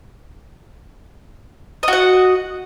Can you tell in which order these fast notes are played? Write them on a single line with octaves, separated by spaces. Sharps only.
D#5 F#4 F#5